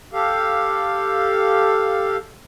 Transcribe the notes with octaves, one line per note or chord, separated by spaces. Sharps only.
G4 A4 F5